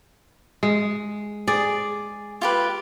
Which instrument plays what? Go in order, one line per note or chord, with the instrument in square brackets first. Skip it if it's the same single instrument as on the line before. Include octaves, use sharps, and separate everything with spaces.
[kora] G#3
[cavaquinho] G#4 [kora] D5
[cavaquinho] F4 G4 B4